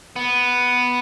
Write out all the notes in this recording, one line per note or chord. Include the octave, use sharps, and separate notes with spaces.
B3